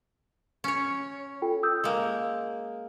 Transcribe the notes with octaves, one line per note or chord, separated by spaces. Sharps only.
C#4 C#5
F4 A4 G5
D#6 E6 G6
G#3 A#3